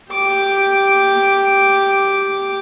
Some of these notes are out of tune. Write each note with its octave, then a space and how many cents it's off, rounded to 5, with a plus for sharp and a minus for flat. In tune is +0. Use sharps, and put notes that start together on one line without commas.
G4 +0 D6 +0